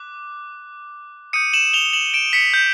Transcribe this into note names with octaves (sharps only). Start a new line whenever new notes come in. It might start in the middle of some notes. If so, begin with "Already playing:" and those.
Already playing: D6 F#6
D#6 G6 C#7 D#7
E7 F#7
F7 G7
E7 F#7
D7 E7
B6 C#7
G6